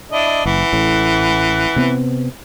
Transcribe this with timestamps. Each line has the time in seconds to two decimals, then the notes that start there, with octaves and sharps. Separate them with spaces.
0.12 D4 E4 D#5
0.46 F#1 E3 F#5
0.73 A1 A2
1.76 C3 B3 C4